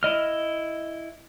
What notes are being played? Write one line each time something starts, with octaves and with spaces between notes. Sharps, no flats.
E4 D#5 F6